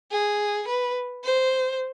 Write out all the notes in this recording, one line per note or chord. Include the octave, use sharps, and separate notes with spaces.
G#4
B4
C5